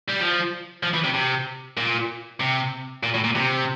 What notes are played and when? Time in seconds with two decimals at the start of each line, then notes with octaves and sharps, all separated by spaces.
0.08 G3
0.20 F3
0.83 F3
0.94 E3
1.04 C3
1.14 C3
1.77 A#2
2.41 C3
3.03 A#2
3.14 A2
3.24 A#2
3.35 C3